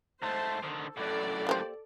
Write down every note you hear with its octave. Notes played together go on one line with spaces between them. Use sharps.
G#2 A3 C5 A5
D3 D#3 A4
F#2 A2 A4 B4 D5
A#3 G4 C5